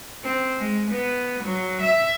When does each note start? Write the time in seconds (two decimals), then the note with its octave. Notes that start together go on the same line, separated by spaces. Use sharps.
0.24 C4
0.59 G#3
0.91 B3
1.43 F#3
1.82 E5